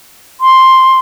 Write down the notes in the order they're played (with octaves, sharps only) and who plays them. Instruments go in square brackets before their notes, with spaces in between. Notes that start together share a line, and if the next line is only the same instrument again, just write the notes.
[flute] C6